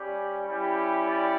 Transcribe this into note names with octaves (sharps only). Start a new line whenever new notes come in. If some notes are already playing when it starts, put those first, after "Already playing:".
Already playing: G3 C#4 G4 D5
G3 C#4 E4 G4
D5